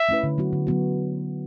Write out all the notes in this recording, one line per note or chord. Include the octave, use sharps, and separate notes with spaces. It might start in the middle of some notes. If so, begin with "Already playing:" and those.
Already playing: E5
A3 C#4 E4 B4
D3
F#3 B3 F#4
D3
F#3 B3 F#4